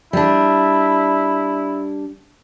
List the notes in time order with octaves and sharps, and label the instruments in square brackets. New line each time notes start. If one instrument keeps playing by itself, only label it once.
[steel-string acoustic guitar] G3 D4 [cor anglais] E4